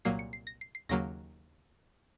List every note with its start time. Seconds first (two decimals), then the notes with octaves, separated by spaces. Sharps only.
0.05 C2 A#2 F#3 A#3 C7
0.19 C#7
0.33 C7
0.47 A#6
0.61 C7
0.75 C7
0.89 D#2 C#3 F#3 A#3 A#6